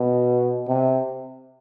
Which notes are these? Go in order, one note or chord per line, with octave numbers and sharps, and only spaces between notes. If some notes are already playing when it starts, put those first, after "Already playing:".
Already playing: B2
C3